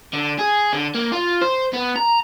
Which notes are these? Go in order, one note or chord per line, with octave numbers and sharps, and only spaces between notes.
D3
G#4
D3
A#3
F4
C5
B3
A#5